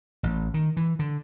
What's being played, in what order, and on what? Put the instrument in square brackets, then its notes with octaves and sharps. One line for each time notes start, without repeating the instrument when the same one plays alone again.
[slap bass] A1
D#3
E3
D3